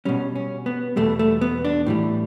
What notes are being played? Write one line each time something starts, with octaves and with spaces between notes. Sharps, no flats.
B2 G3 C#4
C#4
B3
E2 B2 G3 A3
A3
B3
D4
A2 E3 G3